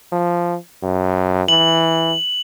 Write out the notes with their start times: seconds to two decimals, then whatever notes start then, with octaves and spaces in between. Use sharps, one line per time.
0.12 F3
0.83 F#2
1.48 E3 F#7